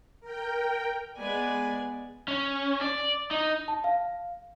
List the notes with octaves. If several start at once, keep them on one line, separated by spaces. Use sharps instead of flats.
A#4 G5
G#3 B3 B4 D5 G#5
C#4
D5
D#4
A5
F5